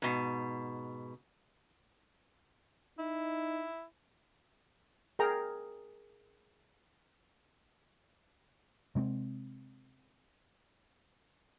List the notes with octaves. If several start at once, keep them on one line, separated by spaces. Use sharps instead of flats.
G#2 B2
D#4 E4
G#4 A#4 G5 A#5
C3 G#3 A#3 C4